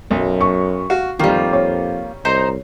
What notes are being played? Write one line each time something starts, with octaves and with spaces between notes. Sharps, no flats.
B1 F#2
C#6
F#4 F5
F2 D#3 G3 A#3 F4
C#5
C2 D#4 C5 A#5